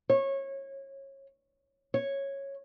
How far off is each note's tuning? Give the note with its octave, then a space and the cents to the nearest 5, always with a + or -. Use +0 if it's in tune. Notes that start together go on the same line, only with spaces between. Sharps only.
C#5 -25
C#5 -10